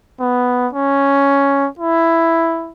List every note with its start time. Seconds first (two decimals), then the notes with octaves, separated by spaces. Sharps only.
0.20 B3
0.73 C#4
1.79 E4